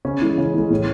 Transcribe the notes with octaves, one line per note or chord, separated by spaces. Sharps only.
C#3 C#4
E3 G#3
C#3
E3 G#3
A2